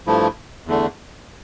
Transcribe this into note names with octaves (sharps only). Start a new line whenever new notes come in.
G2 F3 A3 E4
E2 D3 A3